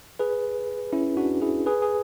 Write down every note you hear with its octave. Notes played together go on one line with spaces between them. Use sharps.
G#4 B4
C#4 E4
D4 F#4
E4 G#4
G#4 B4
G#4